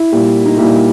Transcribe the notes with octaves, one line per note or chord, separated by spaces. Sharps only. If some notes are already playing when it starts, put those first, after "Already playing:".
Already playing: E4
A#2 G3
D#4
A#2 G3 E4